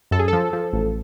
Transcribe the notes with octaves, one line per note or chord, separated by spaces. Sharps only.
F#2 A4
G#4
F3 A4
F3
A1